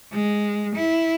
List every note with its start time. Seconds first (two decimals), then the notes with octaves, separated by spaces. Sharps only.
0.13 G#3
0.76 E4